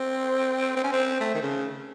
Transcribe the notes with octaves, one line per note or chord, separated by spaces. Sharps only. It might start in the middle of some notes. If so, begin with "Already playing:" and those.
Already playing: C4
C4
C#4
C4
A3
D#3
C#3